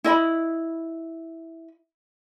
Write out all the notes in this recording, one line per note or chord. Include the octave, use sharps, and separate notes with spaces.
E4 D#5 B5